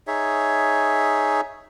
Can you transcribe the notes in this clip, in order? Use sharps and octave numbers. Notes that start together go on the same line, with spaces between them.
D#4 G#4 C#5 E5